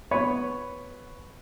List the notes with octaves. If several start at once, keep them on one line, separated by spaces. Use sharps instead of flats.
B3 B4 C#5